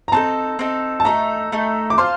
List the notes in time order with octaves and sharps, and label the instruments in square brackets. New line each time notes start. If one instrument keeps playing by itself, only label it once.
[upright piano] A#5
[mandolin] C4 D#4 A4 [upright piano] A5
[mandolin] C4 D#4 A4
[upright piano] A5
[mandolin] A3 D#4 A4 [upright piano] A#5
[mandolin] A3 D#4 A4
[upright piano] D6
[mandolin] F4 C5 F5 A5 [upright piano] C6